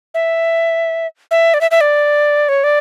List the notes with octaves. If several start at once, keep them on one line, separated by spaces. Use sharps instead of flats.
E5
E5
D5
E5
E5
D5
C#5
D5